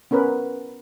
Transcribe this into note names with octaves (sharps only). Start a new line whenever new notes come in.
B3 C#4 A#4 B4